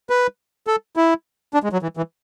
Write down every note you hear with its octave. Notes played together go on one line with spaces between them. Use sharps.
B4
A4
E4
D4
G#3
F#3
E3
E3